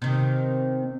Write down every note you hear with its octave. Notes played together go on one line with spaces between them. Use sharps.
C3 D#3